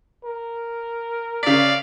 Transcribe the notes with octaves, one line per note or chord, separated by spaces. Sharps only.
A#4
C#3 D5 F5 B6